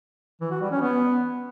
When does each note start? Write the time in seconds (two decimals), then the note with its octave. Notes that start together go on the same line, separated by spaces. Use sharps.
0.41 E3
0.51 F#4
0.61 G3
0.71 C#4
0.81 B3